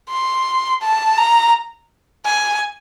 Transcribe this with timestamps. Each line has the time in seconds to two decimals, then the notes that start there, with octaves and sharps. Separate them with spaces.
0.10 C6
0.82 A5
1.18 A#5
2.26 G#5